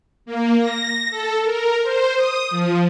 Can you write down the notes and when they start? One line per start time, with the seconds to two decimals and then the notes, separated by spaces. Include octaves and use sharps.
0.26 A#3
0.60 A#6
1.11 A4
1.44 A#4
1.83 C5
2.17 D#6
2.51 F3